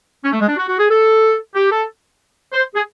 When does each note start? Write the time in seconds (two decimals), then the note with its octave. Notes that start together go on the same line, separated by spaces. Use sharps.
0.23 C#4
0.33 A3
0.40 G#3
0.48 D4
0.57 F#4
0.67 F#4
0.78 G#4
0.89 A4
1.55 G4
1.71 A4
2.53 C5
2.75 G#4